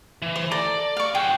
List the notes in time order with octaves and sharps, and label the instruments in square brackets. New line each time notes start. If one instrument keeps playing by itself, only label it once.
[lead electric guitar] E3
[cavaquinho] C5
[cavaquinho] A4 A#5 [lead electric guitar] D5
[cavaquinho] F5 C#6
[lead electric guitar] F#4 G#4 [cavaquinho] G5